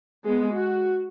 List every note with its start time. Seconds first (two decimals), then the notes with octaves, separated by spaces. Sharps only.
0.25 G#3 B3
0.55 F#4